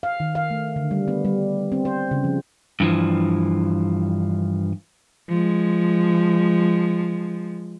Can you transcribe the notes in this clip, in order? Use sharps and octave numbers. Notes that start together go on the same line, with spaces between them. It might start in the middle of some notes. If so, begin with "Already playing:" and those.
F5
D#3
F5
A3
D3
G3
B3
G3
C4
C5
C#3
F3
G2 E3 F3
F3 G#3